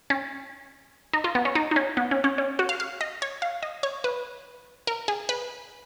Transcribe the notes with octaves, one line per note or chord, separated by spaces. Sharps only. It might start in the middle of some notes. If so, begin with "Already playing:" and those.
C#4
D#4
F4
B3
C#4
D#4
D#4
C#4
B3
C#4
C#4
C#4
F#4
F5
F5
D#5
C#5
F5
D#5
C#5
B4
A#4
G#4
B4